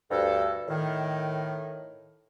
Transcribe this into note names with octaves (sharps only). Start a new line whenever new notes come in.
D2 G2 A4
A2 D#3